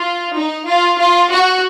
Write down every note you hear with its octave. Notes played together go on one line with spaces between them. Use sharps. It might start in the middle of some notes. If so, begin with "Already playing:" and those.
Already playing: F4
D#4
F4
F4
F#4